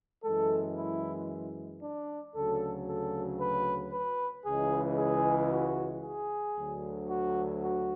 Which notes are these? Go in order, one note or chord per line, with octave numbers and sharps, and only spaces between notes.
F#2 E3 G#3 A4
E4
D4
D2 C#3 F#3 A4
A4
B4
B4
C#2 C#3 E3 G#3 G#4
G#4
F#4
G#4
D2 D3 F#3
F#4
F#4